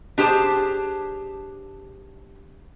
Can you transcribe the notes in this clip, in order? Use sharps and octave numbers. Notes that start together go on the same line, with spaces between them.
D4 G4 G#4 C5 A5